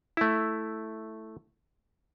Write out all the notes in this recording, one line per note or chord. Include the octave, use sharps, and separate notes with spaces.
A3 E4